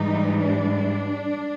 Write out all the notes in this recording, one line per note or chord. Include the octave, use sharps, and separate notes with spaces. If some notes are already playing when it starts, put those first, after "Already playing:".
Already playing: G#2 E3 G3 D#4
D4